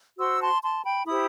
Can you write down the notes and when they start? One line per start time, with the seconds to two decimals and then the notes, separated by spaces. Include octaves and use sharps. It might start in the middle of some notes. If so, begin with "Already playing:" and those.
0.18 F#4 C5 C6 E6
0.40 A5 C6
0.62 A5 C6
0.84 G5 B5
1.06 E4 G4 C5 B5 D#6